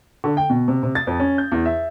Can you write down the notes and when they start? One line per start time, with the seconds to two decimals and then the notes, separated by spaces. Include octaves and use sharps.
0.24 D3
0.37 G5
0.50 B2
0.68 C3
0.83 C3
0.95 A6
1.07 F2
1.20 C#4
1.38 G6
1.52 E2
1.66 E5